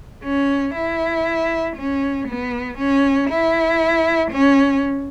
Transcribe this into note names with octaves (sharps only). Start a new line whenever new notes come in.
C#4
E4
C#4
B3
C#4
E4
C#4